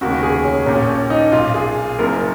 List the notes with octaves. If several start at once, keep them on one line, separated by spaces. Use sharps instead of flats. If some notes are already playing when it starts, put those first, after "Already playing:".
F1 D#2 C#3 F#4
G#4
C#4
A#1 A#2 C#4
C#4
D#4
B1 A#2 F4
G#4
F#1 F#2 C#3 A#4